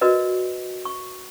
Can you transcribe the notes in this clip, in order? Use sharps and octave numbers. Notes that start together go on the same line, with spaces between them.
F#4 A#4 B4 D5 D#5
C#6